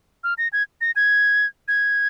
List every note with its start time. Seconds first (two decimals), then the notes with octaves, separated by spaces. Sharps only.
0.24 F6
0.38 A#6
0.53 G#6
0.81 A#6
0.96 G#6
1.68 G#6